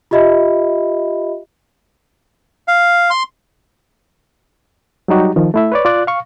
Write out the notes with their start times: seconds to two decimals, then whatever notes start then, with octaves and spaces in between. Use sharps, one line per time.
0.11 F4 G4 D#5 E5 B5
2.68 F5
3.10 C6
5.08 F#3 G3 D#4 F#4 G4
5.36 D#3 F3
5.54 A3 E4 E5
5.72 B4 C#5 D5
5.85 F4 D5 F#6
6.07 F5 C#6